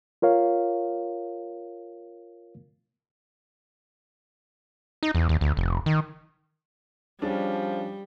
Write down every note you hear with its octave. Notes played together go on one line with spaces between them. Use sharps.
F4 A#4 C#5 F5
D#4
E2
D#2
D2
F1
D#3
F3 G3 C#4 D4 G#4